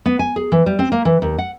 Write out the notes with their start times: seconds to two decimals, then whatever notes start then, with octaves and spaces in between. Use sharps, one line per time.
0.06 B3
0.19 G#5
0.36 G#4
0.52 E3
0.66 G3
0.79 C4
0.92 A#3
1.05 E3
1.22 D#2
1.38 F#5